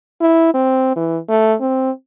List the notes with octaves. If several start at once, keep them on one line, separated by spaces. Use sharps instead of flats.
E4
C4
E3
A3
C4